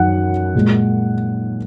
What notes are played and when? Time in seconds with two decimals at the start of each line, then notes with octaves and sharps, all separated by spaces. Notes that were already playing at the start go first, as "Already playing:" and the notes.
Already playing: F#2 D#3 F#3 F#5
0.55 A#2 G#3